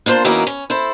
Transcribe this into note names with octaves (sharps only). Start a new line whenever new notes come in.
A#3 D4 F4 C5 A5
D#3 F#3 A#3 B3 C#4 E4
C#4
E4 A4 C5